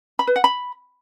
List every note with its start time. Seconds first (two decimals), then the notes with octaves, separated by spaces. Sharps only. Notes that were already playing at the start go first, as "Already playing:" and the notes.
0.19 B5
0.27 B4
0.36 F#5
0.44 B5